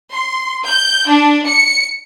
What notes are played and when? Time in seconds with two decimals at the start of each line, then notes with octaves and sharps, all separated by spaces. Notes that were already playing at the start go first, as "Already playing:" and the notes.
0.12 C6
0.66 G6
1.08 D4
1.46 C#7